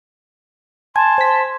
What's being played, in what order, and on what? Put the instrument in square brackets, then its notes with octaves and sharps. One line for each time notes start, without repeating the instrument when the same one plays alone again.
[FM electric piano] G#5 [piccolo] A5 [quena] C6 [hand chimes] G#6
[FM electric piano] C5 B6